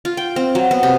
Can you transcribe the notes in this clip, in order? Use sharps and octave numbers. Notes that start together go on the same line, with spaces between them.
F4
G5
C4
F#3
B3
C3